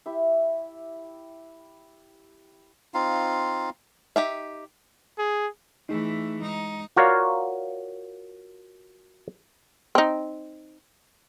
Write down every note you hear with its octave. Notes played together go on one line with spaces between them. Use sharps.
E4 G4 E5
C4 D#4 F4 F5
D#4 G4 E5
G#4
E3 A3 D#4 G#4
G#3 D#4
F4 F#4 A#4 C#5 D5 F5
C4 D#4